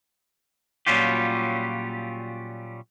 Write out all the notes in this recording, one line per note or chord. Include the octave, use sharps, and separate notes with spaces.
A#2 F#3 G3 C#4 F4 G4